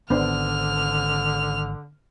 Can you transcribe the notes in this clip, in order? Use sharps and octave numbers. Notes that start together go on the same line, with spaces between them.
G#1 D3 B3 D4 C5 F6